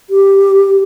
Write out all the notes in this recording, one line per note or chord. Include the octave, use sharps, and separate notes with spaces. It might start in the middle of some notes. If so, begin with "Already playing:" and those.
G4